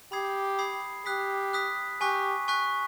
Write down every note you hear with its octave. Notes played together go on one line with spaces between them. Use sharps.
G4 B5 D#6 G#6 C7
B5 D#6 G#6 C7
G4 D#6 F#6 B6
D#6 F#6 B6
G4 G#5 C#6 F#6 B6
G#5 C#6 F#6 B6